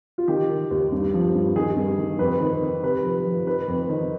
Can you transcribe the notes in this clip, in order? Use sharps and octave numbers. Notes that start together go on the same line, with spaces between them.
F4
D#3 G4
D#3
D#2
G2
F3
G2
D#3 G#4
G2
D#3
F2 B4
D#3
D#3
C3 B4
F3
F3
D#3 B4
F2
D#3